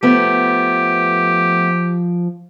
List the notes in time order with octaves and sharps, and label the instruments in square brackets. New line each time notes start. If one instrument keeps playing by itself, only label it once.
[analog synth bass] F3 [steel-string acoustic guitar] A3 B3 [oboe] G4